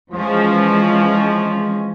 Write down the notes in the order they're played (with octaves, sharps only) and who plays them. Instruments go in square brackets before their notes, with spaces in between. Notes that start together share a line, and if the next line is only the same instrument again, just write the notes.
[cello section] E3 G#3 C#4 [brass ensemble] F3